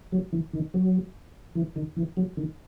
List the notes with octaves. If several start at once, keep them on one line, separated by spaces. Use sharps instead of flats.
F#3
E3
D#3
F#3
E3
D#3
E3
F#3
D#3